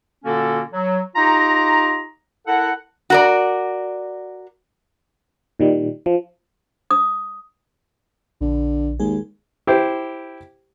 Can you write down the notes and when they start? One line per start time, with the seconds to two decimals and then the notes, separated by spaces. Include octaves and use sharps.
0.25 A#2 D3 A#3 C#4 F#4 A4
0.73 F#3
1.16 D#4 F4 G4 A#5
2.47 E4 A4 A#4 F#5
3.10 F#4 A#4 D5
5.59 A#2 D#3 G3
6.06 F3
6.91 D#6
8.41 A#1 D3
9.00 D#2 G#3 G#4
9.67 E4 G4 C5